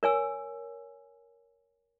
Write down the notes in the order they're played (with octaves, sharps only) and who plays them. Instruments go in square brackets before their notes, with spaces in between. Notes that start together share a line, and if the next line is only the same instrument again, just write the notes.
[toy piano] A#4 C#5 G#5 E6